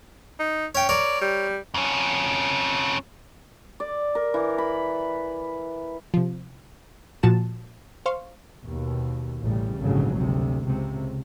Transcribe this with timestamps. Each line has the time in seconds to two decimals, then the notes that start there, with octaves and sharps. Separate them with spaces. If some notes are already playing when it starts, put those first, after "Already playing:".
0.39 D#4
0.75 C#4 C#5 G5
0.89 A#4 C#5 D5
1.21 G3
1.74 F2 C#4
3.80 D5
4.15 A#4
4.34 E3
4.58 B5
6.14 C3 F3
7.23 A#2 F3 F#4 A5 E7
8.06 C5 F5 C6 C#6
8.64 D#2 B2
9.42 A1 C#3 G3
9.82 G#1 D2 A#2 C#3 F3 F#3
10.16 D2 C3
10.66 C#2 C3